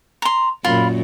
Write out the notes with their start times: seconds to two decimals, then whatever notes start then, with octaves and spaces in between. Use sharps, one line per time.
0.22 A#5 C6
0.64 F#2 A#2 F4 B5